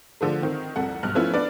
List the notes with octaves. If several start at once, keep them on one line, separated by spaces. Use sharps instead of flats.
D3 F3 A3
D#3 C4
C2 F2 A4 F#5
B1 G2 F6 F#6
F3 A3 B3 C#4 E4 F4
B3 D4 B4 D5